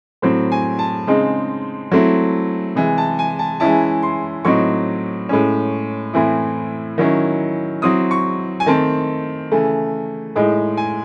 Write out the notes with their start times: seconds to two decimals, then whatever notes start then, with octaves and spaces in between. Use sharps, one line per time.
0.22 A2 F#3 C4 C5
0.52 G#5
0.79 A5
1.07 C#3 G#3 C4 D#4
1.91 F#3 A3 C4 E4
2.75 C3 E3 G#3
2.98 A5
3.19 G#5
3.39 A5
3.60 E3 G#3 C#4 E4 A5
4.02 C6
4.45 A2 F#3 C4 D#4 C#6
5.29 A2 G#3 C#4
6.14 A2 E3 C4 E4
6.98 D#3 F#3 C#4 E4
7.82 F#3 C4 E4 D#6
8.11 C#6
8.60 G#5
8.66 D#3 A3 C4 A5
9.51 C#3 E3 A3
10.36 A2 G#3 D#4
10.77 G#5